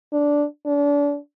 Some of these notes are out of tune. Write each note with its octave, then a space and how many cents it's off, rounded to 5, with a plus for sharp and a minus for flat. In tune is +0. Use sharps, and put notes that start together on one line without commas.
D4 -10
D4 -35